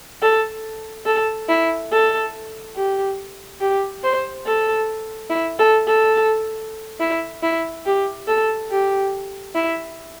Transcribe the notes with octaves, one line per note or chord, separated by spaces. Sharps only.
A4
A4
E4
A4
G4
G4
C5
A4
E4
A4
A4
E4
E4
G4
A4
G4
E4